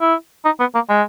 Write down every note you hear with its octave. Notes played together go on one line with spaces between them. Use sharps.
E4
D#4
B3
A#3
G#3